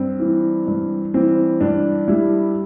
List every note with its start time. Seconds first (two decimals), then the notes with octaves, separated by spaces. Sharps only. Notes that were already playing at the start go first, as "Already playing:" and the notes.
Already playing: G2 C4
0.20 E3
0.67 G2
1.14 E3 C4
1.61 G2 D4
2.08 G3 E4